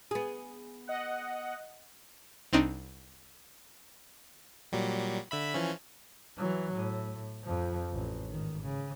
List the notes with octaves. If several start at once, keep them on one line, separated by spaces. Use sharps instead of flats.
B3 G#4
D#5 F#5
C2 C4 D4 D#4
A#2 F#3 G3
D3 E5 B5
E3 F3 C#4
E3 F#3
A2
F2 F3
A1
G#1 D#3
C#3